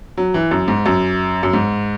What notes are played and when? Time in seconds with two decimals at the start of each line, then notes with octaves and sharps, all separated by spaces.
0.17 F#3
0.34 E3
0.51 F#2
0.68 G#2
0.86 F#2
1.43 F#2
1.53 G#2